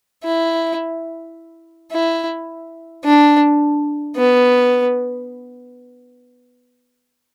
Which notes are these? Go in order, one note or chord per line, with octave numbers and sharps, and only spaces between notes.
E4
E4
D4
B3